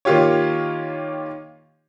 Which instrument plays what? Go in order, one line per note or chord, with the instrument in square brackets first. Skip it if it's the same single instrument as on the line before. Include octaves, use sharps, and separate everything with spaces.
[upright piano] D#3 A#3 F4 G4 C#5